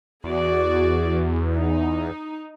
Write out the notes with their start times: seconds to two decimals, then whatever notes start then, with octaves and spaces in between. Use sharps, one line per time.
0.24 E2 F#4 G#4 D5
1.55 D#4